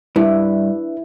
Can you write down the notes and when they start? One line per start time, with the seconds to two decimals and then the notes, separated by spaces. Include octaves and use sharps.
0.16 G2 D4 E4 B4